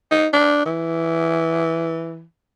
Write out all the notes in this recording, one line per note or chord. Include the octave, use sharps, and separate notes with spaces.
D#4
D4
E3